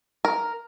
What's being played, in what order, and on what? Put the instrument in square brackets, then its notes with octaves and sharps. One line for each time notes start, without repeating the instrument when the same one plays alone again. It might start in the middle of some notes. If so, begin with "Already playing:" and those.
[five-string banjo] A#4